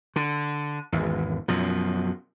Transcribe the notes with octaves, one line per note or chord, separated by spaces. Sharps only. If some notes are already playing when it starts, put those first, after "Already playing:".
D3
G#1 E2
F#2 B2 F3